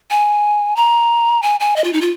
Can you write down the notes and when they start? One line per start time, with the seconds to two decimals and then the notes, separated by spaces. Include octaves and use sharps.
0.11 G#5
0.76 A#5
1.42 G#5
1.60 G#5
1.76 D#5
1.84 F4
1.93 D#4
2.01 F4